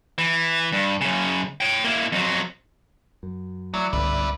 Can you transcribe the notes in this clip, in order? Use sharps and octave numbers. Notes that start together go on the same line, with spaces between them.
E3
G2
F#2 C#3
C#5 G5
A#3 E4
F2 F#3
F#2
F#3 A3 E4 D5
G1 C#2 G#2 G3 B4